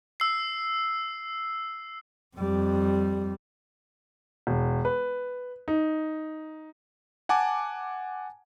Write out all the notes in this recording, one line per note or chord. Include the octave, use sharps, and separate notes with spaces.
E6 C7
F2 G3
E1
B4
D#4
F#5 G#5 A5 D6